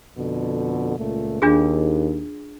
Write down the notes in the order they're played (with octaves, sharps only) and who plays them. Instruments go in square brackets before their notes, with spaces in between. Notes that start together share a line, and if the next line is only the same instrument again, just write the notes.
[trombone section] F2 B2 D3
C#2 A#2 A3
[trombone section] D#2 [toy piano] D4 F4 G#4